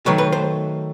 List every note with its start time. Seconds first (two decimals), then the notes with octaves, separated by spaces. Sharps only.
0.06 D#3 F#3 A3 B4
0.18 B4
0.32 C5